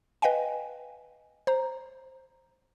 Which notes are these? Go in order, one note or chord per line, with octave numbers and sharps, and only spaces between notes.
B4 D#5 F5 G5 G#5
C5 A#5